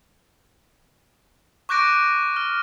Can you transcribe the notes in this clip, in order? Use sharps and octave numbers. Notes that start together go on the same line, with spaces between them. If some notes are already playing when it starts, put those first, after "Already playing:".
C#6 D6 F#6 G6 A#6 D7
F6